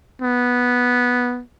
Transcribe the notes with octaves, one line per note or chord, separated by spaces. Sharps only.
B3